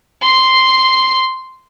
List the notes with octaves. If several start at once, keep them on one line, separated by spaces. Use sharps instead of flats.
C6 C7